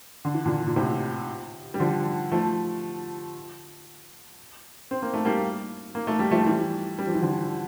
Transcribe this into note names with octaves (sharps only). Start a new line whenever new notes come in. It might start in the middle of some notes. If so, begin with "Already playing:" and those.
D3
E3
A#2 D3
A#2
A2 C3
G3
D3 F3
F3 A3
C4
A#3
A3
G3 A#3
A#3
A3
G3
F3 A3
E3 G3
G3
F3
E3
D3 F3